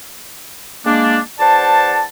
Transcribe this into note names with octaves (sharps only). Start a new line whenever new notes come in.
G#3 A#3 D4
E2 C5 D5 F#5 A5